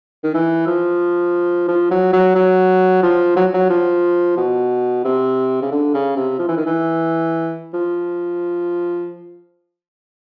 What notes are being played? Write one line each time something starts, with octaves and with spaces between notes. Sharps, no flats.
D#3
E3
F3
F3
F#3
F#3
F#3
F3
F#3
F#3
F3
B2
C3
C#3
D3
C#3
C3
F3
E3
D#3
E3
F3